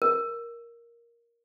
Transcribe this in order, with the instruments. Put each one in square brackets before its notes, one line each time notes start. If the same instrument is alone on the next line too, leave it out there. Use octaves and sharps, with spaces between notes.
[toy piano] A#4